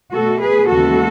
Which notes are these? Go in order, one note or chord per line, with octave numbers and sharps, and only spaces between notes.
B2 A3 F#4 A4
G#4 B4
D#2 C#3 E3 G#3 B3 F#4 A4